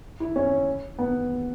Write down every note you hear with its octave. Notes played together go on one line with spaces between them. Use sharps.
E4
C#4
B3